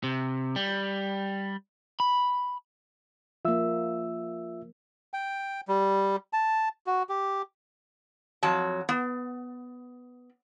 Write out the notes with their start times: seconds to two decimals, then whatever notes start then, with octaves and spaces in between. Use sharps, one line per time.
0.04 C3
0.56 G3
2.00 B5
3.45 F3 A#3 F4 E5 E6
5.14 G5
5.68 G3
6.33 A5
6.87 F#4
7.09 G4
8.43 F2 F#3 A5
8.89 B3